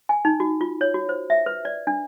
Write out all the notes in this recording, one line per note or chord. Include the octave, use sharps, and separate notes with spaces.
G#5
D#4
F#4
F4
C#5
F#4
C5
E5
B4
D5
D4